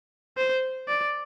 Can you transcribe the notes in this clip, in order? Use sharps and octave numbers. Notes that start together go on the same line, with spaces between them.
C5
D5